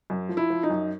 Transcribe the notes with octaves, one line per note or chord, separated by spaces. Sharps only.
F#2
F3
E4
F3
D#4
F#2